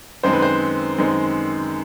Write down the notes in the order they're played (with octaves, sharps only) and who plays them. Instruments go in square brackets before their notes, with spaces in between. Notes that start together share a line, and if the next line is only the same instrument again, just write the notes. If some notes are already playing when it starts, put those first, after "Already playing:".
[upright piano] F#2 D#3 G#3 C4 C5
B4
C5
F#2 D#3 G#3 C4